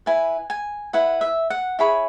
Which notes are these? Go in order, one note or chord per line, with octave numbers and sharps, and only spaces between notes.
E4 B4 G#5
G#5
E4 B4 F#5
E5
F#5
E4 G#4 C#5 B5